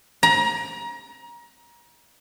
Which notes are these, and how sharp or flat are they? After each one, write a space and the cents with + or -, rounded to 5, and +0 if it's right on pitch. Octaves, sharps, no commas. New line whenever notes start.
A#5 +30